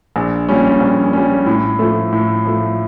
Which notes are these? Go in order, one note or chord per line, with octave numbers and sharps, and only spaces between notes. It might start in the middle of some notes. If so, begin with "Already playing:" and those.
A#1
A#2 G3 C#4
A#1
A#2 G3 C#4
A2
F3 A3
A2
F3 A3